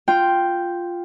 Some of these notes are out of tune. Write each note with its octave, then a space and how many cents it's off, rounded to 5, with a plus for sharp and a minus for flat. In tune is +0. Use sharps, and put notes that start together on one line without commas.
F4 +0 G5 +0